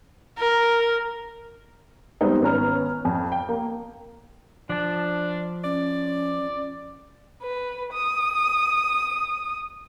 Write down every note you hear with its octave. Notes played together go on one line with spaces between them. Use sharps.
A#4
G3 G#3 B3 C4 D#4
G#1 B3 C#4 B4 A#5 F6
F2
G5
A#3
F3 D4 A5
C#4 D5
B4
D#6